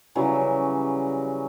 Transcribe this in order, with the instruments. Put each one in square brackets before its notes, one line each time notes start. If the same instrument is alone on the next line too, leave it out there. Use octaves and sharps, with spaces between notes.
[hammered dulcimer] C#3 E3 F#3 G3